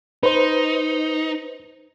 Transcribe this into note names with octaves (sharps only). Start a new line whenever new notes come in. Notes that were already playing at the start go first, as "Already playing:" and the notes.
D#4 B4 C5